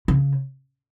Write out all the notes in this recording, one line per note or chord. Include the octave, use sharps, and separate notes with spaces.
C#3